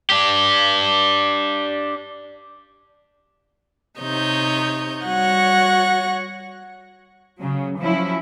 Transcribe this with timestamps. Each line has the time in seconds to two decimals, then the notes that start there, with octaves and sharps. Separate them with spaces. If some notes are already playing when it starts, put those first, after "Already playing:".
0.10 D4 G4
4.00 C3 D#4 C#5 G6
5.05 G3 F#4 C#5 F#5 C#6 A#6
7.38 C#3 F#3
7.78 F3 F#3 C#4 E4